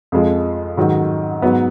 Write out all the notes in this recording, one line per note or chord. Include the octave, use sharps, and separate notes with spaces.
F2 F3 G#3
G#2 D#3 F#3
G#2 F#3 B3